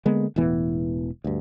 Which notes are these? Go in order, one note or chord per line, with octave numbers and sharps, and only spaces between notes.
D3 G#3 A#3 B3
E1 A2 E3 B3
D2 G2